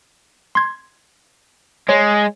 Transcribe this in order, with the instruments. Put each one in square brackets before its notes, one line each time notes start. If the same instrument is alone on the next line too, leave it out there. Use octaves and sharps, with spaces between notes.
[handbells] C6 G#6
[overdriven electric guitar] G#3 [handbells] C#5